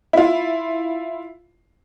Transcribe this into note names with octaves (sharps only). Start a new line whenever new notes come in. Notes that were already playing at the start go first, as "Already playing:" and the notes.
E4 F4